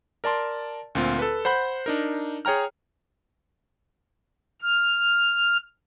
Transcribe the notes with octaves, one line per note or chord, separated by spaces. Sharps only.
A#4 D5 A5 C6
D2 A#2 C4 F4
A4 B4
C5 F#5 B5 G6
D4 D#4 A#4
G#4 C#5 G5 A#5 F6
F6